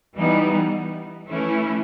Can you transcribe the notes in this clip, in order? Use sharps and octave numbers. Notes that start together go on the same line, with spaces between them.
E3 G3 B3 D#4
E3 A3 C#4 E4